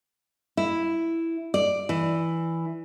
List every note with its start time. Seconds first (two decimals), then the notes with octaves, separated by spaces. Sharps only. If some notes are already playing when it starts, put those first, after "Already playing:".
0.57 E4
1.54 D5
1.89 E3